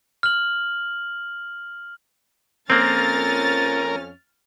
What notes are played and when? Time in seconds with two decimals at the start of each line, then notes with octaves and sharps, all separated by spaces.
0.23 F6 F#7
2.70 F2 A#3 C4 C#4 A#4 F6 A6